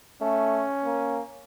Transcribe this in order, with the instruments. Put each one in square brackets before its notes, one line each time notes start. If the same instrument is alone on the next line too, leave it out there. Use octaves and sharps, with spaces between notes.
[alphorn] A3 [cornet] C#4
[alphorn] A#3